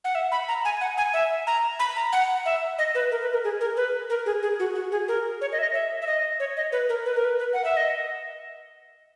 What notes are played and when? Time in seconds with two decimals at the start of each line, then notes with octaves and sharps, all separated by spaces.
0.04 F#5
0.15 E5
0.32 B5
0.48 A#5
0.65 G#5
0.81 F#5
0.98 G#5
1.14 E5
1.47 A#5
1.79 B5
1.96 A#5
2.13 F#5
2.46 E5
2.78 D#5
2.95 B4
3.11 A#4
3.22 B4
3.33 A#4
3.44 G#4
3.61 A#4
3.77 B4
4.10 A#4
4.26 G#4
4.42 G#4
4.59 F#4
4.75 F#4
4.92 G#4
5.08 A#4
5.41 C#5
5.52 D#5
5.59 E5
5.63 D#5
5.74 E5
6.02 E5
6.07 D#5
6.40 C#5
6.57 D#5
6.72 B4
6.89 A#4
7.06 B4
7.15 A#4
7.24 B4
7.39 B4
7.53 F#5
7.65 E5
7.77 D#5